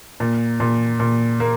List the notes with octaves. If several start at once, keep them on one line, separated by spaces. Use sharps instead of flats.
A#2
A#2
A#2
A#3